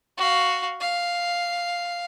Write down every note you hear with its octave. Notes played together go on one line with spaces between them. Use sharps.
F#4 F5
F5